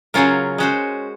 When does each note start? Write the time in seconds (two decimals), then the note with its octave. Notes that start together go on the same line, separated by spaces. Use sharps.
0.14 C#3 F#3 C#4 F4 A#4
0.58 G#3 C#4 F#4 C5